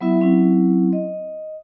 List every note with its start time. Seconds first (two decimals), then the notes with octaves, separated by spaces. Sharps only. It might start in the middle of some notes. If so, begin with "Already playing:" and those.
0.01 F#3 B3 E4 E5
0.20 F#3 C4 C#4 E4
0.93 D#5